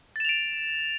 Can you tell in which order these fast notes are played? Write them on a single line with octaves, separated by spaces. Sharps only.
A6 E7 F7 D7